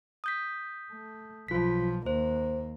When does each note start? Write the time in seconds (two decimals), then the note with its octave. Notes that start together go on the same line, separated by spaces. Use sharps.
0.24 D#6 G6 B6
0.92 A3
1.48 B1 F3 F4 B6
2.06 D#2 A#3 C5